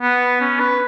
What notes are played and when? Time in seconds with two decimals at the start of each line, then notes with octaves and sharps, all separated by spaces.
0.01 B3
0.41 C#4
0.60 B4